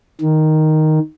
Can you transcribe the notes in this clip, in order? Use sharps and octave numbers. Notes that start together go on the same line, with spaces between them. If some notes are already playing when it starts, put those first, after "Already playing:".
D#3